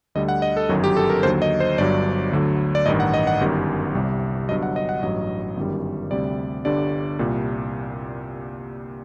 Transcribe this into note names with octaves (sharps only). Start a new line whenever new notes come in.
D2 D3 G3 D#5
F#5
D#5
A4
G1 F#2 D#3 F#3 F#4
G4
A4
A#4
D#2 D3 F#3 C5
D#5
C5
G1 G2 F#3 D5
D2 D3 F#3
D5
A1 G2 D#3 D#5
F#5
D#5
F#5
G1 F#2 D#3 G3
C2 C3 G3
G1 G2 F#3 D#5
F#5
D#5
F#5
A1 G2 F#3 D#5
G1 F#2 D#3 G3
D2 C3 G3 D5
G1 G2 D3 G3 D5
C2 A#2 G3